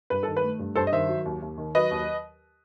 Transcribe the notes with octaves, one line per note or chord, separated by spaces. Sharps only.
G2 B4
D#3 A4
B4
A3
G2
G2 A4 C5
D#5
D#3 C5 E5
F#3
D#2
D#2
D#3
F#3 B4 D#5
D#2